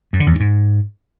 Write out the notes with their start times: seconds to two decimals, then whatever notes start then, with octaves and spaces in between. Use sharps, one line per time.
0.13 F#2
0.20 D3
0.26 E2
0.33 F#2
0.40 G#2